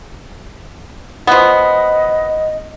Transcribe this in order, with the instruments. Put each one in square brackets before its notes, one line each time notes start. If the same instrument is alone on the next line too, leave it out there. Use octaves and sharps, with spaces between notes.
[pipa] F3 B3 [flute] D#5